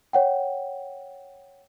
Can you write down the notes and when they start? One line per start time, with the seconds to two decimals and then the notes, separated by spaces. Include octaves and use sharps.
0.13 C#5 F#5 G5